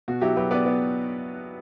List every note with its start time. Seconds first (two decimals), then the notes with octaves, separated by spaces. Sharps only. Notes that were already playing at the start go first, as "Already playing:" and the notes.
0.08 B2 F#4
0.21 F#3 E4 G4
0.36 F#3 G4 B4
0.51 B3 B4 D5
0.66 B3